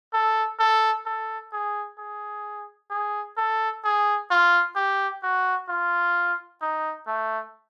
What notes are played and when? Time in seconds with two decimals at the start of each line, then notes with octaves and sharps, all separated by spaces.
0.14 A4
0.60 A4
1.06 A4
1.53 G#4
1.99 G#4
2.91 G#4
3.37 A4
3.84 G#4
4.31 F4
4.76 G4
5.23 F#4
5.69 F4
6.62 D#4
7.08 A3